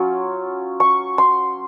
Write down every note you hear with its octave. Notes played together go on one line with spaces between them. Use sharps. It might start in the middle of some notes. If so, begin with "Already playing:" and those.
Already playing: F#3 C#4 F4
C#6
C6